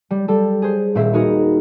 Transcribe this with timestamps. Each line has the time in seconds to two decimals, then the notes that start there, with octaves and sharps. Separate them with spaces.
0.11 G3
0.28 G3 A4
0.62 G#4 C5
0.95 D#1 A#2 C4 C5 E5
1.12 B3 C4 D#4 F#4 G#4 A#4